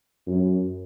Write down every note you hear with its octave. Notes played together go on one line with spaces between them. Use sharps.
F#2